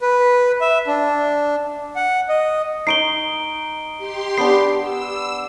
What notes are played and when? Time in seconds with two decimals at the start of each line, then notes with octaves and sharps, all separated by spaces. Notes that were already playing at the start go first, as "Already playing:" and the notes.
0.01 B4
0.61 E5
0.87 D4
1.96 F#5
2.29 D#5
2.87 D#4 C#6 C7 D7 G7
3.98 G4 C6
4.38 B3 D4 C7
4.79 E6